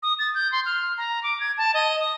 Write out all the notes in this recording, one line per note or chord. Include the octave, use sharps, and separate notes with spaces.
D#6
A6
G6
C6
F6
A#5
D6
G#6
A5
D#5
D#6